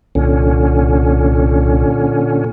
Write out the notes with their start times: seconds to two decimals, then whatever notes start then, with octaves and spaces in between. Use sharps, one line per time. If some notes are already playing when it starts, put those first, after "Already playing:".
0.15 C2 A#2 D3 C#4